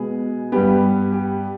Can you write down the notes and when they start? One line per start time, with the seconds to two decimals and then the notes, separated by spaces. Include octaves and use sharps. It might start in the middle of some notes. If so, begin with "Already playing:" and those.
Already playing: B2 G#3 B3 G#4
0.52 G2 G3 B3 G4
1.13 G4